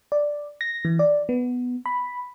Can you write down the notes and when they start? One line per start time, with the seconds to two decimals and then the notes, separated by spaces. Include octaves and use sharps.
0.12 D5
0.61 A#6
0.85 E3
0.99 D5
1.29 B3
1.86 B5